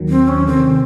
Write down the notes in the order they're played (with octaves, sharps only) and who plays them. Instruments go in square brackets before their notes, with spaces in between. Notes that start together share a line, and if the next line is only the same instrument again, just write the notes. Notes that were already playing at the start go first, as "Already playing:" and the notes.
Already playing: [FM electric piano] D#2 D#3 F#3
[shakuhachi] C4
C#4
[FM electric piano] C3 D#3 A3 [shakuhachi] C4